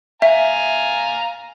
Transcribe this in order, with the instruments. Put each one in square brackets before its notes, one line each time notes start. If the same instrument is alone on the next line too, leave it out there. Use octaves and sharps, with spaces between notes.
[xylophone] E5 [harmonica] F5 G#5 A#5